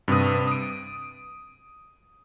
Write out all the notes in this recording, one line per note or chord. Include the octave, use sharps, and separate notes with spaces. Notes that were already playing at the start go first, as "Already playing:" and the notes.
G2 C3 B4 D#6
D#6 D7